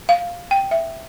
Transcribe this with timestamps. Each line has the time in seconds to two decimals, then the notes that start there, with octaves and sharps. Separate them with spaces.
0.09 F5
0.51 G5
0.71 E5